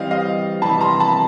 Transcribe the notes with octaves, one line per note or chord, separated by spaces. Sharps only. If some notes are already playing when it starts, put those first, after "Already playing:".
Already playing: E3 G3 C4 D#5 F5
D#5 F5
F2 C3 E3 G3 A5 B5
A#5 C6
A5 B5